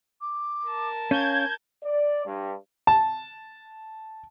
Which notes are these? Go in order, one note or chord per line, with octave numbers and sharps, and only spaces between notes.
D6
A#4 A5
C#4 F5 G6 G#6
D5
G2
A5